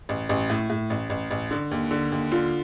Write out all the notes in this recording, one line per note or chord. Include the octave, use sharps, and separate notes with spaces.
A1
A1
A2
A2
A1
A1
A1
D3
D#2
D3
D#2
D3 F4